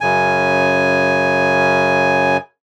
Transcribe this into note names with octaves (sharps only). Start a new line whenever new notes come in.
F#2 C#3 G#5